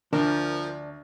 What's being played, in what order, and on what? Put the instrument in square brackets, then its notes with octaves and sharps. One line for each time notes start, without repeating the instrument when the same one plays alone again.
[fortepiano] D2 [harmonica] F3 [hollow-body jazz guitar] D4 [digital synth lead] A#4